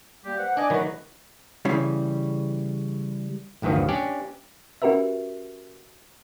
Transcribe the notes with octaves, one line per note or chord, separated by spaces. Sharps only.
G3 A#3 G4
B4 C5 F#5
D4 D#5 G#5 D6
D#3 F#3 A3 F#4 B4
C#3 E3 G3
A1 D2 G2 D#3 F3
C#4 D4 G4 D5
C#4 F#4 G4 A#4 B4 E5